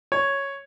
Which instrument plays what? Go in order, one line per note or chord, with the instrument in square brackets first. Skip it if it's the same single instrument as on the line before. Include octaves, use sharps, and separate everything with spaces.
[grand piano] C#5